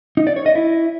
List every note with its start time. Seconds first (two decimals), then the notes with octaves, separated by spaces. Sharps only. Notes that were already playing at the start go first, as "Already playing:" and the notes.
0.17 D#4
0.27 D5
0.36 C#5
0.46 D#5
0.55 E4